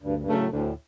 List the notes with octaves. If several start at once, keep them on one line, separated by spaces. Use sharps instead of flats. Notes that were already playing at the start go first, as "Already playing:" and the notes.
D2 G2
G2
C#3 F#3 A3
A2
D2 A2